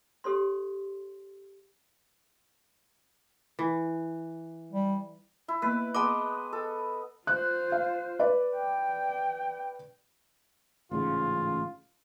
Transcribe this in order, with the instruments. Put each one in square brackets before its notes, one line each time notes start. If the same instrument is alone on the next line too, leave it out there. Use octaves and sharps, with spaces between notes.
[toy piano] G4 A4 C#5 C6
[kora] E3
[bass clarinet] G3
[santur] E4
[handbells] A#3 B3 E6 [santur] B4
[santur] G#3 B3 D#5 [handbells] A5 D6
[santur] A4
[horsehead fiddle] F4 C5 [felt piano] F#6
[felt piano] F5
B4 D5
[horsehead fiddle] G5
[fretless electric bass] A1 G#2 C#3 [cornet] F4